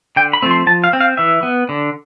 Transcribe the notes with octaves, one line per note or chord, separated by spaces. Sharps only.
D3 G5
B5
F3 A3 C4
C6
F3 A5
F5
C4
F5
E3 E5
B3
D3